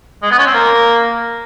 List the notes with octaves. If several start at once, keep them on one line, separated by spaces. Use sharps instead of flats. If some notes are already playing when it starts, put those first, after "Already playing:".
G#3
B3
C#4
C4
A#3